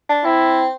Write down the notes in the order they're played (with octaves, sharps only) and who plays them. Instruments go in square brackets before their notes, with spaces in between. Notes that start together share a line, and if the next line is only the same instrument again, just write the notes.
[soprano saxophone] D4
[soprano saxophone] C4 [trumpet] E4